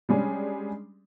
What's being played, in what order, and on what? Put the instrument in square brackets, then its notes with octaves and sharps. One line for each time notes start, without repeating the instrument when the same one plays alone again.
[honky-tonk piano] G3 G#3 C#4 D4